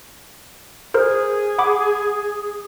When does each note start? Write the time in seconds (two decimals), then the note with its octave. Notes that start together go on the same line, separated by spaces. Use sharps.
0.94 G#4 A#4 C5
1.59 F#5 B5 D6